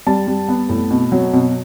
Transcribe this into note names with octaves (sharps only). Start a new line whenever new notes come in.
G3 A5
G3
B3
A2
B2
F#3
B2